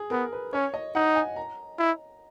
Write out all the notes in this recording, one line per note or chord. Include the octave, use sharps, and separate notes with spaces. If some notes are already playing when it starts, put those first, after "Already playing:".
Already playing: G#4
B3 A#4
B4
C#4 C#5
D#5
D#4 F#5
G#5
A#5
E4